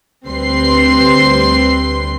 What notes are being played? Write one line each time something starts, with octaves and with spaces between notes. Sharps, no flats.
D2 G3 C4 B4 C6 C7